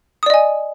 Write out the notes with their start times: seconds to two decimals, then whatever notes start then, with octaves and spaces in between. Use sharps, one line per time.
0.23 D#6
0.26 D5
0.30 D#5
0.34 G#5